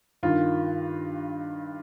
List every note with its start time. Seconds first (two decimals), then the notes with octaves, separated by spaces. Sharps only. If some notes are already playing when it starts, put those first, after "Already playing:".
0.23 G2 D#3 F4